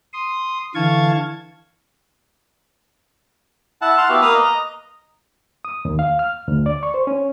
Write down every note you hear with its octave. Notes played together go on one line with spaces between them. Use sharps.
C6 D#6
D3 E3 F5 A5 C#6 G#6
E4 F#5 A5
F#5 A5 C6 F6
B3 E4 F#4 G4 F5
A#3 B4 F5 D#6 F6
D#5 A#5
D#6
D#2
F5
F6
D2
D5
C#6
C5
C#4